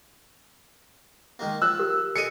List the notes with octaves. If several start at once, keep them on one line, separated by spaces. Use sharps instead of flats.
D#3 G#3 A#3
F3 E6 F#6
G4 A#4
G#4 A4 D#5 C#7 D#7